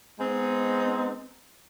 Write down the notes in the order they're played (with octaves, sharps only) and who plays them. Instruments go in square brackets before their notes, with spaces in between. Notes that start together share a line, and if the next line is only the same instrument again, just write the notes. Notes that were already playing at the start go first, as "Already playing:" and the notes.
[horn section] G#3 B3 C4 D#4